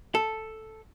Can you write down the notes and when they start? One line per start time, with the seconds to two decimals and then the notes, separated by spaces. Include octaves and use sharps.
0.15 A4